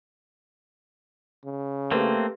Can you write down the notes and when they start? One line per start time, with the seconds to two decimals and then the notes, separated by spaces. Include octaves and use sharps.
1.45 C#3
1.91 A3 A#3 C4 G4 A4 B4